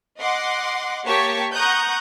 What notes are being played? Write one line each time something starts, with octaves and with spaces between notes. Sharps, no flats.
D#5 F#5 C6 D6
A#3 G4 C#5 A5 C#6 B6
F#5 A#5 C#6 D#6 F#6 G6